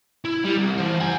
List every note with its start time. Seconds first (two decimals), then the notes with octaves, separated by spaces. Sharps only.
0.25 E4
0.44 G3
0.57 C2
0.78 E3 C5
1.00 F#5 G#5